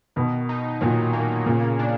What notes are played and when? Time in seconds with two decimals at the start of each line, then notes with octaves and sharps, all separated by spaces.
0.16 B2 D#3
0.49 D#4
0.81 A#2 F#3
1.13 A#3
1.46 A#2 C#3
1.79 D4